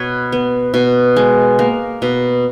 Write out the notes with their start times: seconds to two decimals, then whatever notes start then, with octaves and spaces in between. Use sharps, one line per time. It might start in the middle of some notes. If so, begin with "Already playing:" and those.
Already playing: B2 B4 C#5
0.32 B3
0.74 B2
1.16 G#3
1.59 A#3
2.02 B2